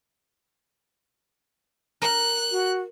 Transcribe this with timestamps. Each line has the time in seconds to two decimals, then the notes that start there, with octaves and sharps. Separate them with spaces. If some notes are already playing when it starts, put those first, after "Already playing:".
2.02 A#4 F#6
2.52 F#4